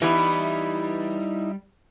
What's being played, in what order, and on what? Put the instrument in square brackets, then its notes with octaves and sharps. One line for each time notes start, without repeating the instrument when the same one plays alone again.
[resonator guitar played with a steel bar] E3 B3 [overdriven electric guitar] G3 [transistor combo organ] D#4 E4